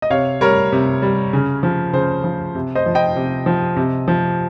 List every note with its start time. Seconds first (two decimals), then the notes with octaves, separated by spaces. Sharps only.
0.02 D#5
0.10 C3 C#5 F5
0.41 G3 A#4 C#5
0.72 C3
1.02 G3
1.33 C#3
1.63 F3
1.93 C#3 C5
2.24 F3
2.55 C3
2.75 C5 D#5
2.86 F3
2.95 D#5 G5
3.16 C3
3.46 F3
3.76 C3
4.08 F3